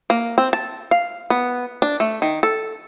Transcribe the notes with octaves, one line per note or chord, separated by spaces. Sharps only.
A#3
C4
A5
F5
B3
D4
A3
D#3
A4